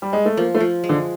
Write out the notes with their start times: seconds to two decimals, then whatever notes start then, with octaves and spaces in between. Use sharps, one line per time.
0.02 G3
0.13 G#3
0.25 A3
0.37 F3 A#3
0.55 A3
0.60 F3
0.84 G#3
0.89 D3